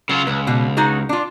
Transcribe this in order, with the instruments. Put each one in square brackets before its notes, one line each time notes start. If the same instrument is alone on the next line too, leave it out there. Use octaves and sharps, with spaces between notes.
[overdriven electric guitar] C#3 F4 [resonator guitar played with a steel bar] F#3
[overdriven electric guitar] C#2 [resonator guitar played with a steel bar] B4
[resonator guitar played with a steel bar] B2
D#4 F#4 G#4
D4 F4